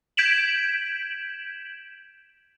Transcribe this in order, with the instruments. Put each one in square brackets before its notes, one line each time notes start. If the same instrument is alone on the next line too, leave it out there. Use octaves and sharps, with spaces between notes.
[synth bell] G6 G#6 B6 D7 E7 F#7